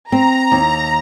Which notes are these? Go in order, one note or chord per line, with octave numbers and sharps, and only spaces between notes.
C4 A#5
D#2